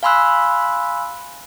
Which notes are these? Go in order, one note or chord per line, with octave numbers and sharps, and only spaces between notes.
F5 G#5 B5 C6 E6 F#6